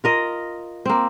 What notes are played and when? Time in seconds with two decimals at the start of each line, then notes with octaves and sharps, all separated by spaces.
0.04 F4 A#4 D#5
0.85 A#3 C4